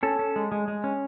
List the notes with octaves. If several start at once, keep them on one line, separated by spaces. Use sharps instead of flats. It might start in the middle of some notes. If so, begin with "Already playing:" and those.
C#4 A4
C#4
G#3
G#3
G#3
C#4